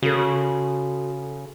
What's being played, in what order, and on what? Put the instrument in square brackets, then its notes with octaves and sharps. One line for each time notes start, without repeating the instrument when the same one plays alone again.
[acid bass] C#3 [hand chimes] F#4 A4